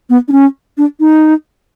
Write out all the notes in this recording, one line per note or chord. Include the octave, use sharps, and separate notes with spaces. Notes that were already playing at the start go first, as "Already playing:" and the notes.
B3
D4
C#4
D4
D#4